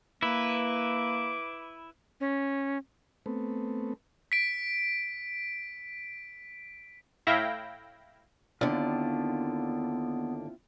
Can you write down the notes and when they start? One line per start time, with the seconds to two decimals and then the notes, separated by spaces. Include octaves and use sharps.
0.23 A#3 E4 B4 D6
2.20 C#4
3.26 A3 B3 C4
4.32 B6 D7
7.27 A2 E4 E5 F5 G5 A#6
8.61 D#2 D3 B3 C4 D4 E4 F4